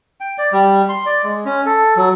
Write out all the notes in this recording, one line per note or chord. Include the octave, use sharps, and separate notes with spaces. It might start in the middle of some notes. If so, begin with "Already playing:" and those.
G5
D5
G3
C6
D5
G#3
C#4
A4
F#3